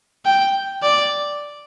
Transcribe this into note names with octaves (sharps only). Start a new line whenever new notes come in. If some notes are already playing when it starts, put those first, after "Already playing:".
G5
D5